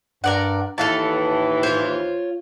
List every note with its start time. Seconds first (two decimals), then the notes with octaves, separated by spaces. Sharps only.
0.24 G2 A#4 D5 F#5
0.78 D#2 A2 E3 A4 F5 A5
1.63 F4 C5 C#5